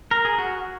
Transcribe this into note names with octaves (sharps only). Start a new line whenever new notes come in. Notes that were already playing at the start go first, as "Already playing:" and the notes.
A#4
G#4
F#4